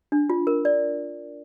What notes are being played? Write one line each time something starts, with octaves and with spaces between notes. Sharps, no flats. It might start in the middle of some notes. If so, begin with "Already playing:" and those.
D4
F4
A#4
D5